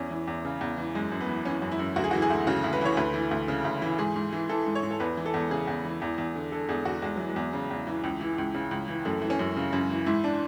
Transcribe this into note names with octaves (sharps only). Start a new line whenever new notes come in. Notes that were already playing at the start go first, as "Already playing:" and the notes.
Already playing: E2 C#4
E3
E2
C#3
E2
E3
F#2 G#3
F#2
B3
E3
E3 C#4
F#2
E4
F#2
D2 F#4
G#4
E3 F#4
G#4
D2
C#3 F#4
D2
B4
E3 C#5
D2 B4
E3
D2
C#3
D2
E3
G#2 G#4
G#2
E3
E3 A4
G#2
C#5
G#2
A4
E2 B4
E3
A4
E2
C#3 G#4
E2
E3
E2
E2
D3
D3 A4
E2 G#4
E2 F#4
E2 G#3
E3 F#3
G#3
E2
C#3
E2
E3
C#2
E3
C#2
C#3
C#2
E3
F#2 A3
E3
C#4
F#2
C#3
F#2
E3
G#2 E4
D4